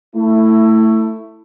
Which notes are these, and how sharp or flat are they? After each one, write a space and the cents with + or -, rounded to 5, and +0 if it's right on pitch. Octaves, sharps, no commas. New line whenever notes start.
A3 +15 E4 +0